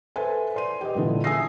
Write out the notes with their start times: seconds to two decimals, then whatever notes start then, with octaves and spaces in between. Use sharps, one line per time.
0.16 A4 B4 C5 E5 G#5
0.54 D5 C6 D#7
0.81 G4 B4 D#5
0.95 G2 A#2 D3 E3
1.24 E5 G#5 D#6 E6 A#6 C7